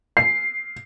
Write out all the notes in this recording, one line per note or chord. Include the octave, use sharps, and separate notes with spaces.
C7